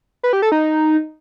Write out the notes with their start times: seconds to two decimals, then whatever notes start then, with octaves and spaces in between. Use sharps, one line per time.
0.23 B4
0.33 G4
0.42 A4
0.52 D#4